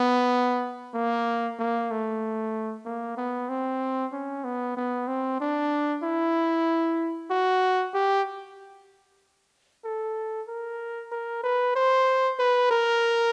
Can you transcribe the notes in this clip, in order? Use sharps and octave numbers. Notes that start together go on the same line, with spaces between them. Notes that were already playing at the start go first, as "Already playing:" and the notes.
Already playing: B3
A#3
A#3
A3
A#3
B3
C4
C#4
B3
B3
C4
D4
E4
F#4
G4
A4
A#4
A#4
B4
C5
B4
A#4